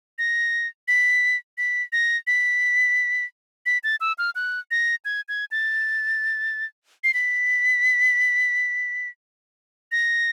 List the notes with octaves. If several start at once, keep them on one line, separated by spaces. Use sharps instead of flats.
A#6
B6
B6
A#6
B6
B6
A6
E6
F6
F#6
A#6
G#6
G#6
A6
C7
B6
A#6